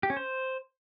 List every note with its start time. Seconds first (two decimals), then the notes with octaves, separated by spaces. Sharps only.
0.03 G4
0.10 C#4
0.17 C5